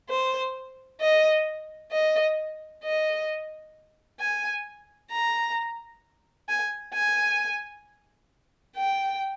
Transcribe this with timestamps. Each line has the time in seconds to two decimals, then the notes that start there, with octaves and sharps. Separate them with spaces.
0.09 C5
1.00 D#5
1.92 D#5
2.83 D#5
4.20 G#5
5.12 A#5
6.48 G#5
6.94 G#5
8.76 G5